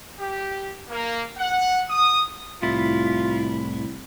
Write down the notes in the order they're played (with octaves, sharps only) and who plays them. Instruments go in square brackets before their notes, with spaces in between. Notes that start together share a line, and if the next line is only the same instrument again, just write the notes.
[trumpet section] G4
A#3
F#5
D#6
[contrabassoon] C2 [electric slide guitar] A2 E4 [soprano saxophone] F4